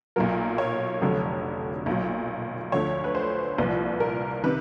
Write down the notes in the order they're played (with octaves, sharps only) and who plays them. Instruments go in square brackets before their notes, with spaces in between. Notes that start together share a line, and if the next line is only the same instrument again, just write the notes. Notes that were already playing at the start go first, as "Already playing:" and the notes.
[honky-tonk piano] B1 A#2 F#3 A#4
C#5
F1 F2 D3 F#3
B1 A#2 F#3
D2 D3 F3 C#5
B4
C5
C2 A#2 F3 B4
A#4
C3 D#3 B4